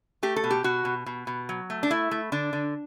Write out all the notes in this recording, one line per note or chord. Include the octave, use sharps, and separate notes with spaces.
A3 G4
A4
B2
G4
B2 F#4
B2
B2
B2
F#3
A3
D4
A3 E4
A3
D3 D4
D3